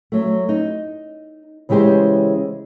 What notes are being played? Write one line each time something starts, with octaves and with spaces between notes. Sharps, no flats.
F#3 A3
D#4
C#3 E3 G#3 G4 C5